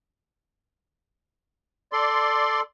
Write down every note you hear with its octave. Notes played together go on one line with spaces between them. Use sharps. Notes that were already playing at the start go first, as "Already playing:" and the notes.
A4 D5 C6